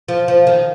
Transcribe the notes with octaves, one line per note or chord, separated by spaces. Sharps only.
F3
F3
D#3